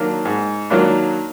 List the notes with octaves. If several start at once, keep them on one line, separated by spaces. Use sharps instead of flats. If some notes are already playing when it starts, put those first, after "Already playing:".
Already playing: D#3 F#3 A#3 D4
G#2
D#3 F#3 A#3 D4